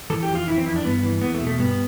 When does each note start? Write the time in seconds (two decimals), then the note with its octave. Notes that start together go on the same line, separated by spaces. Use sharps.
0.10 E3 A4
0.23 G4
0.29 F2
0.35 F4
0.47 E3 E4
0.57 C4
0.66 F2 E4
0.76 D4
0.84 G2 B3
1.03 E3
1.21 E2 B3
1.34 A3
1.41 B2
1.47 A3
1.59 G2 B3